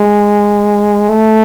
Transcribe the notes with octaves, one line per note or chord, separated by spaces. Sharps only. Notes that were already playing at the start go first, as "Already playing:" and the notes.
Already playing: G#3
A3